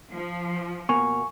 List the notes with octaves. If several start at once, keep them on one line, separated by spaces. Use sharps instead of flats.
F3
B2 A#3 G#5 C#6